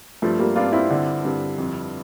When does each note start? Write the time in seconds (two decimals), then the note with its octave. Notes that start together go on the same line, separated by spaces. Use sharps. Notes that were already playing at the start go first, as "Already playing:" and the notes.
0.22 G2 F3 A3
0.39 G3 A#3
0.56 G2 D4 F4
0.73 C4 E4
0.90 D3
1.25 G2
1.58 F2